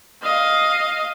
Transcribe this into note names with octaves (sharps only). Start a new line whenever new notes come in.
D#5 F5